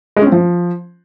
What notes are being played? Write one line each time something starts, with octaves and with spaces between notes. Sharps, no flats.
G#3
C#4
C4
F3